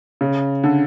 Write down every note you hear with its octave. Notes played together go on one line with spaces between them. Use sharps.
C#3
D3